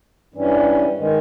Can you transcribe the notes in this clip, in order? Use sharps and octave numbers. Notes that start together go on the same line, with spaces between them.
G2 E3 G3 C#4
D#3 G#3